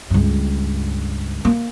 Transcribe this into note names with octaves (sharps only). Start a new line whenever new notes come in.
C#2 G2
A#3